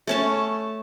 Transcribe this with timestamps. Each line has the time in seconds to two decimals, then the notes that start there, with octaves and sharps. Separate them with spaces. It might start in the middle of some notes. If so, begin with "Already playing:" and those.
0.07 A3 C#4 A5